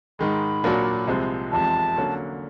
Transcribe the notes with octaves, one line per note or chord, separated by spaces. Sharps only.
G#2 D#3 G#3 B5
A#2 F#3 A#3 D4 F#4
C2 C3 F3 G#3 C4
F1 E2 C3 F3 G#3 A5
D3 F#3 A#3 C#4